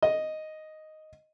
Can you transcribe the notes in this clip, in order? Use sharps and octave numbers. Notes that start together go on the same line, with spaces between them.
D#5